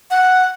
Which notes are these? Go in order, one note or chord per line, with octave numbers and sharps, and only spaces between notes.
F#5